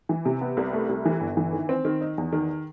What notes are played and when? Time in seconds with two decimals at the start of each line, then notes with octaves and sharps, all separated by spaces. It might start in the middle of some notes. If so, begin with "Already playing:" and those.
0.09 E3
0.25 C3
0.41 B3
0.57 C2
0.73 A3
0.89 C2
1.05 E3
1.21 G1
1.37 E3
1.53 D#3
1.69 C4
1.85 D#3
2.01 D#4
2.18 E2
2.32 D#3